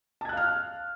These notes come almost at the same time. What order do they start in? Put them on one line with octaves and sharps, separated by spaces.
A5 G#6 F#6 F5 F6